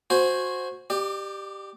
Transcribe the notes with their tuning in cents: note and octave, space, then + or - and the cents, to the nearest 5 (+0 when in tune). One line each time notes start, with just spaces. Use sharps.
F#4 -15 C5 +0 G#5 -5
G4 +0 D5 +35